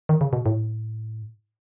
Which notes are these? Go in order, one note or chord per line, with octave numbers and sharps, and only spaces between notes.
D#3
C#3
B2
A2